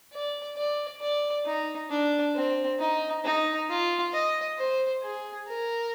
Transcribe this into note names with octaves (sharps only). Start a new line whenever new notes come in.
D5
D5
D5
D#4
D4
C4
D#4
D#4
F4
D#5
C5
G#4
A#4